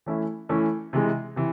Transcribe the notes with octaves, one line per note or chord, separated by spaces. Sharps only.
E3 A3 C#4 E4
E3 A3 C#4 E4
C3 E3 G#3
C3 E3